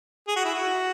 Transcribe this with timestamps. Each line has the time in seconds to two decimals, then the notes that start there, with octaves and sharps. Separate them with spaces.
0.28 G#4
0.36 F#4
0.45 E4
0.54 F#4